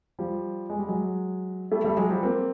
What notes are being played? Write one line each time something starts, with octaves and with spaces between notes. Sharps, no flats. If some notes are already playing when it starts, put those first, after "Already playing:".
F3 G3
G#3
G3
F#3 G#3
G3 A3
G3 A3
F#3 G#3
F3 G3
A#3 C4